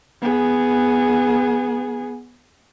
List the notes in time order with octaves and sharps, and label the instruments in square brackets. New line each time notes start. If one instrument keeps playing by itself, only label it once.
[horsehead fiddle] B3 G#4